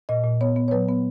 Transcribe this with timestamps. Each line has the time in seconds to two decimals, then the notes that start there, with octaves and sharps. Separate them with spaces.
0.09 A#2 D#5
0.24 A#2
0.41 B3 C#5
0.56 B3
0.68 C#5
0.71 F#3 B4
0.88 B3